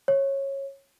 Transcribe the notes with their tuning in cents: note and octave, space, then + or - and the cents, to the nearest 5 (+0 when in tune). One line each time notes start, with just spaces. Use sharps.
C#5 -15